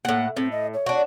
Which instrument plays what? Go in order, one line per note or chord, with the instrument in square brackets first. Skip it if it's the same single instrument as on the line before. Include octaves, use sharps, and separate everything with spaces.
[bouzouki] A2 F#5 [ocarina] A#3
[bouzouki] A2 [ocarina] C4
[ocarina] D#5
C#5
[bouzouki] D4 F#4